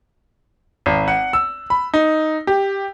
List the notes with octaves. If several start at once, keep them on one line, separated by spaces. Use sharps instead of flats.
G#1
F#5
E6
B5
D#4
G4